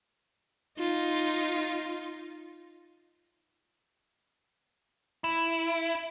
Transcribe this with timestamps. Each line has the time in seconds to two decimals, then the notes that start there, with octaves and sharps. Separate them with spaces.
0.78 D#4 F4
5.24 E4